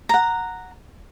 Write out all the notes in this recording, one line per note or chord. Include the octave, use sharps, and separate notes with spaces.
F#5 A#5